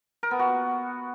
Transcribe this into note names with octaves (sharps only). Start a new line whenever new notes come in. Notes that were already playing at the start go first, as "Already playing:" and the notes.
A#4
B3
F#4